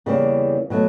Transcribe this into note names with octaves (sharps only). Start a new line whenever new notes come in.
E2 C#3 E3 G3 A#3
B2 F#3 A3